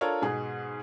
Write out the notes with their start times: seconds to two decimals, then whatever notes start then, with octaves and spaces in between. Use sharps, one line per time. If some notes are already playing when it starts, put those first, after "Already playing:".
0.01 D4 F4 A4 A#4 C#5
0.22 G#2 B2 G#4